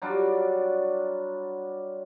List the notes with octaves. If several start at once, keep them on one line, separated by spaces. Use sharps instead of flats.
F#3 G3 D4 F4